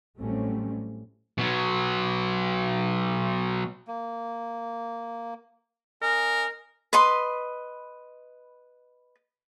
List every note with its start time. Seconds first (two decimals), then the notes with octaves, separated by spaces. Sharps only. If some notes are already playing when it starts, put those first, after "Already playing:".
0.18 A1 F#3 G3 A3 C4 C#4
1.38 B2 F#3
3.87 A#3
6.02 C#4 A#4 D#5
6.93 B4 D#5 B5 C6